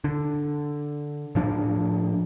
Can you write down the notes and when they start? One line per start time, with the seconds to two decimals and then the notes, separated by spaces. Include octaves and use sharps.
0.04 D3
1.35 A2 F3 D4